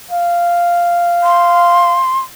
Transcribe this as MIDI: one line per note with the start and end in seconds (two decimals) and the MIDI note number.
0.11 2.01 77
1.23 2.19 84